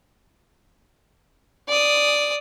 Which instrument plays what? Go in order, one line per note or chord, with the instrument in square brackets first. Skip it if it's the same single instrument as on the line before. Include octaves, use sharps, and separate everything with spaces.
[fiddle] D5 D#6